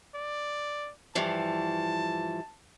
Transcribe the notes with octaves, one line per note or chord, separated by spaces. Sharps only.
D5
G2 E3 F3 A5